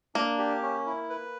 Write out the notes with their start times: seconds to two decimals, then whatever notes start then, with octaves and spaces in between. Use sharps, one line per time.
0.15 A#3 D4
0.39 G4
0.62 C#4
0.86 E4
1.10 B4